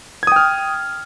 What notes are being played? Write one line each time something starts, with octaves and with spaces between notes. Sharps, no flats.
G5 D#6 F6 G#6